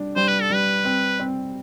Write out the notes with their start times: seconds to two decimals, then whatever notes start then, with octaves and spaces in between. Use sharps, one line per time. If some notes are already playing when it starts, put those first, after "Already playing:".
Already playing: G3 D4
0.16 G3 C5
0.28 B4
0.41 A4
0.50 G3 B4
0.85 C4
1.20 C4